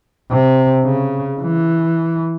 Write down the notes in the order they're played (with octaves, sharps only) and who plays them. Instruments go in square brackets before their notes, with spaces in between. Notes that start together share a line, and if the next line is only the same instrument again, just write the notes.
[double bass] C3
C#3
E3